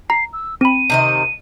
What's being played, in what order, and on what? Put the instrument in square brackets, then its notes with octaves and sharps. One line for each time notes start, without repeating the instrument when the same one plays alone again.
[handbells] A#5 [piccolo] C7
[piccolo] E6
[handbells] C4 B5 [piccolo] D#7
[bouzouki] C3 D#3 D#5